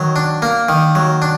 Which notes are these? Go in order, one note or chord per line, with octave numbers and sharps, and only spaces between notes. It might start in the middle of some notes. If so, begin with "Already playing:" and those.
Already playing: D#3 F#3
D4
A#3
D#3
F#3
D4